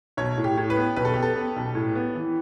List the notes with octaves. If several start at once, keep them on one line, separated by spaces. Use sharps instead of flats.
B1 C#5
A2
G4
A2
B4
B3
B1 B4
A4
B3 G4
A4
B3
B1
A2
B3
E3